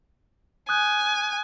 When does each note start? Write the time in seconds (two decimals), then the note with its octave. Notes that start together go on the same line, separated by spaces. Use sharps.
0.69 G#5 D#6 F#6 G6